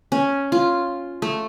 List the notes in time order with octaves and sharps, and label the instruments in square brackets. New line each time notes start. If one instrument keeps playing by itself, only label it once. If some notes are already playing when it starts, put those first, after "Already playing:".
[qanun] C#4
F4
A3